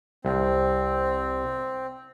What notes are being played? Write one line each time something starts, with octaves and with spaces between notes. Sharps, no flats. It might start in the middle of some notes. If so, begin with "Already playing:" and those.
C2 C4